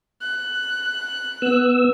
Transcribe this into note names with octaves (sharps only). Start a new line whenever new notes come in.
F#6
B3 E6